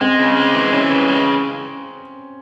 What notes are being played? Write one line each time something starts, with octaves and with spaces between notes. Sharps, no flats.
G#3 C4
C#3
G#3
E3
E3 C#4
C#3
G#3